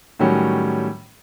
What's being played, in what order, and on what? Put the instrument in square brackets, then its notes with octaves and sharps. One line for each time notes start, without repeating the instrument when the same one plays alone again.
[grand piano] A2 D#3 F#3 G3 C#4